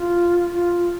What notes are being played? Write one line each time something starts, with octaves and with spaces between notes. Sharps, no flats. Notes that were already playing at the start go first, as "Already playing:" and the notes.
Already playing: F4
F4